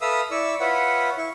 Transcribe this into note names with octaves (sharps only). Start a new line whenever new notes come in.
A4 B4 E5 F5 D#6 E6
E4 D5 C#6 E6
F4 B4 C#5 E5 F#5
E4 C#6